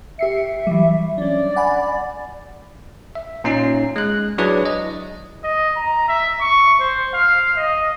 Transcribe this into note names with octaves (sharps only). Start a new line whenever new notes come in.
G4 E5 C7 C#7
E3 F#3 G3
C#4 D4 D5
F#5 G#5 B5
E5
A#2 C#4 D#4 C7
G#3 F#6
F#3 D4 E4 G#4 B4 D5
D#5
D#5
A#5
E5
C#6
C5
F5
D#5